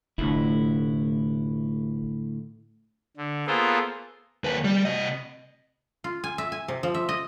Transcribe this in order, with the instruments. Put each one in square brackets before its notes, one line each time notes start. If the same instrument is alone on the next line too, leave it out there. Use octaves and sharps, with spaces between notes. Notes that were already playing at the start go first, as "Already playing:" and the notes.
[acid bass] F1 [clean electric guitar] A2 D3 E4
[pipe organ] D3
A#3 B3 F4 G#4 A4 C5
[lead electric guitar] D#2 B4
G3
C3 D#5
[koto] F4
G#5
E5
G#5
C3
F3
E5
D#5